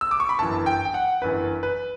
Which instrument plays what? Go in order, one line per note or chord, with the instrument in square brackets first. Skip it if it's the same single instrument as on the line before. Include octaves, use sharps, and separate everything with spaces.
[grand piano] E6
D6
C#6
B5
G1 F#2 E3 A5
G5
G5
F#5
G1 F#2 E3 B4
B4